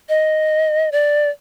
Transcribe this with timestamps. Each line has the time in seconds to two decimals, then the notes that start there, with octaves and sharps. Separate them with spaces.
0.09 D#5
0.92 D5